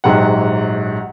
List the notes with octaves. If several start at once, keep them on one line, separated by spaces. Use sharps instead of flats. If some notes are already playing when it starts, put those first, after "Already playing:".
A#1 G#2 F#3 G4 F#5